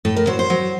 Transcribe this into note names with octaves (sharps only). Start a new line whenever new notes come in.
A2 A4
A#4
F#3 C5
C5
F#3